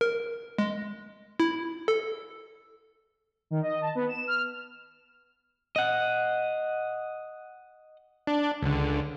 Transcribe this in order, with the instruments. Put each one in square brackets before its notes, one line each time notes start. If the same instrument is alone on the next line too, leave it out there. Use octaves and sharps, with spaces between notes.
[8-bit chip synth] A#4
G#3
E4
A4
[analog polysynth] D#3
D#5
A5
B3
E7
F6
[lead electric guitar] D#5 F#5
[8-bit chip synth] D4
C#2 D3